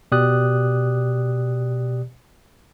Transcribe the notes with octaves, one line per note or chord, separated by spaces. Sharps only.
B2 G4 D5 D#6 F#6